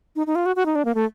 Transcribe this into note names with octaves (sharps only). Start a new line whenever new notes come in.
D#4
D#4
F4
F#4
F#4
D#4
D4
A#3
A3